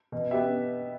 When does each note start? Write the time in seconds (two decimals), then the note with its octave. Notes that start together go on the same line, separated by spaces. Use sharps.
0.12 B2
0.31 B3 G4 E5